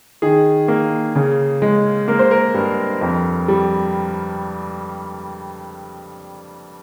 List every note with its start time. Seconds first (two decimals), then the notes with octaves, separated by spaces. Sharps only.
0.22 D#3 G#4
0.68 A#3
1.15 C#3
1.62 G#3
2.08 A#3 A#4
2.19 C5
2.31 A#4
2.54 G2
3.01 F2
3.48 G3